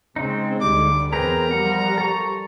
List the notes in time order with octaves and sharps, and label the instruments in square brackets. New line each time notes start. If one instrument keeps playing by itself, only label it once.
[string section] C#3 C4 [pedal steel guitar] G#3 D#4
[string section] D2 D3 G3 [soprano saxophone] D6
[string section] E2 C4 [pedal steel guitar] G#4 B4 G5 [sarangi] A#4 [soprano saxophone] A#5
[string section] F3 G3 [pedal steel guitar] F#5
[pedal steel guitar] A4 C#6